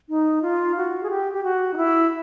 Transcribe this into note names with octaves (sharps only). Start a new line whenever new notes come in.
D#4
F4
F#4
G#4
G4
G4
F#4
D#4
E4